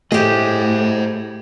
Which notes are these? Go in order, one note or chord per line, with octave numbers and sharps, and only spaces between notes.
A2 A3 G4 G#4 C5 D#5